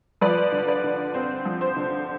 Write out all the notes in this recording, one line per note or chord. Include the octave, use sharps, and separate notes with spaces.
F3 B4 D5
D3
B4 D5
D3
C4 C5
F3
C5
D3